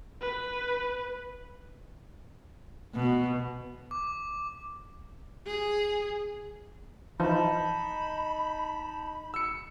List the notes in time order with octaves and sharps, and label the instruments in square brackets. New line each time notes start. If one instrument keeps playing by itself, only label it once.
[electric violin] B4
[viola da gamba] B2
[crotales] D6
[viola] G#4
[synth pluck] E3 F3 [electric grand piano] D#4 [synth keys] A5 E7 [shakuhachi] B5
[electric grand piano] E6 C#7